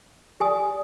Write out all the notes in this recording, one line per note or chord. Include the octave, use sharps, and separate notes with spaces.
G4 D5 G#5 D#6